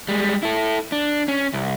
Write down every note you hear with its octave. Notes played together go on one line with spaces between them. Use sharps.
G3 G#3
E4 A4
D4
C#4
C2